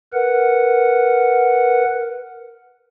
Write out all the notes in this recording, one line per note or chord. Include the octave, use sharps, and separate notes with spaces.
A#4 B4 F#5